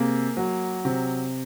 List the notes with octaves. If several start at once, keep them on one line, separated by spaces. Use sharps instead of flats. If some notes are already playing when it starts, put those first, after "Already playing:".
Already playing: C3 A#3 G#4
F#3
C3